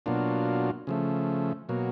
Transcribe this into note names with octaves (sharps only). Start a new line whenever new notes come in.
B2 F#3 A#3 D4 F4
C#3 F3 A3
B2 F#3 A#3